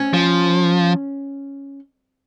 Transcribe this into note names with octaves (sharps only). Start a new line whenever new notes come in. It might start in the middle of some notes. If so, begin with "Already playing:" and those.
Already playing: C#4
F3